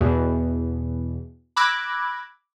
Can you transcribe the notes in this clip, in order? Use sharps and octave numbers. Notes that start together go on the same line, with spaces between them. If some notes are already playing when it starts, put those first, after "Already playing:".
E2 B2
B5 D6 E6 F#6 G#6 A#6